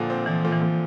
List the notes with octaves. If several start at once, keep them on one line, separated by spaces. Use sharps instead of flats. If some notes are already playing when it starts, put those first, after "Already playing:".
Already playing: A#2 D3 F3
C4
E3 F3
A#2
E3
A#2